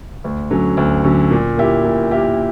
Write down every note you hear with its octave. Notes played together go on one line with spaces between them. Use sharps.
D2
D3 F#3 C#4
D2
D3 F#3 C#4
A#2
A#3 E4 G4
A#2
A#3 E4 G4